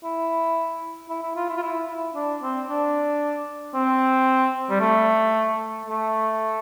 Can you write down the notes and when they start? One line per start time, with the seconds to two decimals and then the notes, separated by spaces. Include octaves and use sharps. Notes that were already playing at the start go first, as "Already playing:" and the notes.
0.04 E4
1.09 E4
1.23 E4
1.36 F4
1.50 E4
1.57 F4
1.63 E4
1.89 E4
2.15 D4
2.43 C4
2.69 D4
3.75 C4
4.70 G3
4.81 A3
5.86 A3